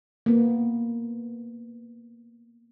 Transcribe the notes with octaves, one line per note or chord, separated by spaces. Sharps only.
A#3 B3